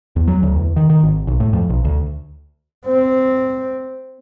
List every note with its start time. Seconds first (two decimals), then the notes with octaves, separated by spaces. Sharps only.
0.16 E2
0.27 F#3
0.43 D2
0.56 E2
0.76 D#3
0.90 D#3
1.03 G#1
1.27 B1
1.40 A2
1.53 F2
1.69 B1
1.85 D2
2.86 C4